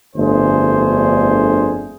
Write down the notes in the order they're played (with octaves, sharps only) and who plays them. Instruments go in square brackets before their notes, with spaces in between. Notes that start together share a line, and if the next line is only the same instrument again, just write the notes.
[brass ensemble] G1 F2 D3 A3 G#4 C5